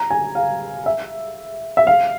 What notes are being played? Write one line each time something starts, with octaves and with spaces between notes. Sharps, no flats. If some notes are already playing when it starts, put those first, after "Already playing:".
Already playing: A#5
G#5
F5
E5
E5
F5